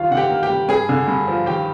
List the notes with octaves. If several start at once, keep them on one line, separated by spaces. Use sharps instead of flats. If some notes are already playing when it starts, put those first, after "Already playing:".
Already playing: D#2 G3 F4 F5
D3 F#5
G4 G5
A#3
G4 G5
G3
G2 G#4 G#5
D3
G2
F3
D#2 G4 G5